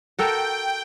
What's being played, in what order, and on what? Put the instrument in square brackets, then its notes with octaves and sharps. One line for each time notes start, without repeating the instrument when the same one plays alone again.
[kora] F#4 A4 A#4 [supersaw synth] G5